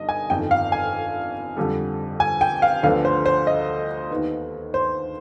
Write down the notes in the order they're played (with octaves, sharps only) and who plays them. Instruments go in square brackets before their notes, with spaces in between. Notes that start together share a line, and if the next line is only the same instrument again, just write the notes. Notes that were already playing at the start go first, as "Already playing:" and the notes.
Already playing: [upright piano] G1 G2 D#3 D#5
G#5
G1 F2 D#3 G5
F5
G#5
F2 D3 G3
G#5
G5
F5
D2 D3 F3 B3 D4 F5
C5
C5
D#5
D#2 D#3 B3
C5